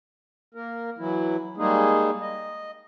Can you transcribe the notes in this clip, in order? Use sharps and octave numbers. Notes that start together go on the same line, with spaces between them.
A#3 A#4
E3 F#3 E4
G3 G#3 A#3 D#4 G#4
D#5